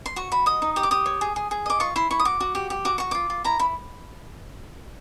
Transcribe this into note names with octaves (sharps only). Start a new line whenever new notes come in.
C6
F#4 C#6
F#4 B5
D#5 D#6
D#4
G4 D#6
D6
G4 D#6
C#5
G#4
G#4
G#4
D#5 D6
F4 C#6
E4 C6
E4 C#6
D#6
F#4 D6
F#4
G4
G4
F#4 D6
F#4 C#6
F4 D6
F4
E4 A#5
E4 B5